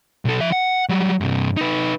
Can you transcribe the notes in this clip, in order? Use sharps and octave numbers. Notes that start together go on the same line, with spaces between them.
B1 A4
F3 E5
F#5
F#3 G3
G2 C3
D#4 B4